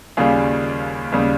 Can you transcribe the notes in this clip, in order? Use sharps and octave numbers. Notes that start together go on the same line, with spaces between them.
D#2 C#3 G3 F4 G#4
D#2 C#3 G3